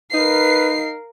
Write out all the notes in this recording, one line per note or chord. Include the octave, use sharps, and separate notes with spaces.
D#4 A#4 B4 F5 C7